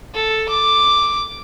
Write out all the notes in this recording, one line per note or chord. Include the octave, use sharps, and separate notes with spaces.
A4
D6